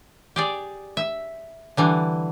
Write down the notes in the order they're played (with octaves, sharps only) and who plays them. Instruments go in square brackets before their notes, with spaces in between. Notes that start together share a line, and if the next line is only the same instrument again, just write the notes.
[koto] G4 G#4 D5
E5
D3 E3 G3